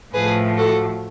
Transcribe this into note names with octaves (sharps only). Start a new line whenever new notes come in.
A2 F3 A3 G#4 B4
F#4 A4